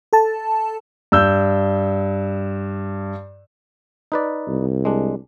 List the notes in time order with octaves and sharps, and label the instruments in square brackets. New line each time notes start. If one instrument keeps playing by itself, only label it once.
[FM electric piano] A4 A5
[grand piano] G2 E6 G6
[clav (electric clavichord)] D#4 B4 D5
[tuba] C2
[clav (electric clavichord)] G#3 D4